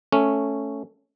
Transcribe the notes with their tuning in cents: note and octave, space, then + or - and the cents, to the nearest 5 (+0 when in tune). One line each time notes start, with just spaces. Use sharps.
A3 +0 C#4 +0